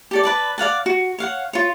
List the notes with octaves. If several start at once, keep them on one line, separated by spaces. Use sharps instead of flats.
G4 A4 D5
B4 D5 A5
D5 F5 F#5 A5
F#4
C#5 F5 F#5
F4 C#5